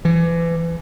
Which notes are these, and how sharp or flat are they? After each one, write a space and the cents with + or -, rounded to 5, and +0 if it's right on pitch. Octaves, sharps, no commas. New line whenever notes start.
E3 +30